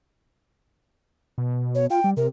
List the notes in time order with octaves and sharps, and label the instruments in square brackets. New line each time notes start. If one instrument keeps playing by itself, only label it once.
[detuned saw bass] B2
[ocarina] C#5
[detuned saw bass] F4 [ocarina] G5
[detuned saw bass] G3
[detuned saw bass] C3 [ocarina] A#4